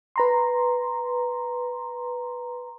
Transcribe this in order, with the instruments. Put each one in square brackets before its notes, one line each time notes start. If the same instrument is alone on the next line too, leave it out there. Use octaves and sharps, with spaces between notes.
[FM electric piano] B4 A#5 C6